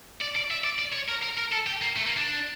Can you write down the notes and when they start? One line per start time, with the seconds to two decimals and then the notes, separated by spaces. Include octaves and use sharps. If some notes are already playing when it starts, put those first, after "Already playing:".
0.21 D5
0.35 D5
0.51 E5
0.64 D5
0.79 D5
0.93 C#5
1.09 A#4
1.23 A#4
1.38 A#4
1.52 A4
1.67 G4
1.82 A#3
1.96 A3
2.06 A#3
2.17 D4